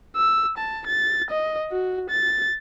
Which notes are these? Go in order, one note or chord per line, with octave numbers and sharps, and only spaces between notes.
E6
A5
A6
D#5
F#4
A6